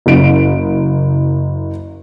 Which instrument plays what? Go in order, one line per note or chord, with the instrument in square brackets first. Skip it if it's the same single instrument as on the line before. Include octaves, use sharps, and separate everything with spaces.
[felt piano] F#1 D7